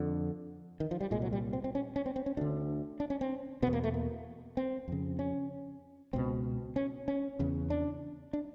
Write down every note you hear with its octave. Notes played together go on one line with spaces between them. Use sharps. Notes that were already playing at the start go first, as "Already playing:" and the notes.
Already playing: F2 D3
D#3
F3
G3
C2 A#2 G#3
F#3
G3
C4
C4
C#4
C#4
C4
C4
C#4
D2 D3 D4
D4
C#4
C4
E2 B2 B3
A#3
A3
A#3
C4
F2 C#3
C#4
C#2 B2 C4
C#4
C#4
E2 C#3
D4
D4